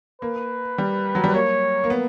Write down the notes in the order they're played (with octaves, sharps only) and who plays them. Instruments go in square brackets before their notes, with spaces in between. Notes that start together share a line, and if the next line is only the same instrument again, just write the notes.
[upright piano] A#3 [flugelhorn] B4
[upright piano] G3
F#3
G3
[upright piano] A#3 [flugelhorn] C#5
[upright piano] A#3
B3